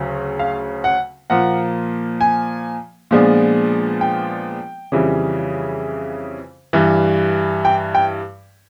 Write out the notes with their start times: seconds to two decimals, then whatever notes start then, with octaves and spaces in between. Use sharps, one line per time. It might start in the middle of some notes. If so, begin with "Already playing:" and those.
Already playing: D2 C#3 F#3
0.39 F5
0.84 F#5
1.30 A#2 F3 A#3 F#5
2.21 G#5
3.11 A#2 F3 G#3 B3 D4
4.01 G5
4.92 F2 C#3 E3 G3
6.73 G2 E3 G3
7.65 G5
7.95 G5